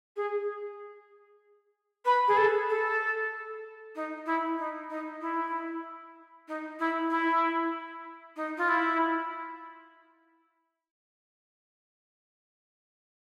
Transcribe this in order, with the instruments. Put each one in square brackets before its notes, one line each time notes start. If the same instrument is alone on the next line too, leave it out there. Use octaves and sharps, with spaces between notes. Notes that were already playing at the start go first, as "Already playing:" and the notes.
[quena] G#4
B4
G#4
A4
A4
D#4
E4
D#4
D#4
E4
D#4
E4
E4
D#4
F4
E4